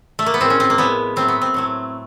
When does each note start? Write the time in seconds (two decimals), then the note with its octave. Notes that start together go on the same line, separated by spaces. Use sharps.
0.19 A3
0.26 A#3
0.34 B3
0.40 A2 F3 G#3 C4
0.50 C#4
0.60 C4
0.70 A#3
0.78 A2 F3 G#3 B3
1.16 A2 F#3 A3 C4
1.28 B3
1.42 C4
1.54 A2 F#3 A3